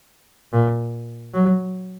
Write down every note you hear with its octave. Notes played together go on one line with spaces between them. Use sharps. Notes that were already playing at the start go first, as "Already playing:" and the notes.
A#2
F#3